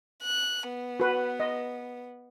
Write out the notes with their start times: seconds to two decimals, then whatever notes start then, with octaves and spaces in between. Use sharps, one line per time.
0.23 F#6
0.68 B3
1.00 F#4 B4
1.40 D#5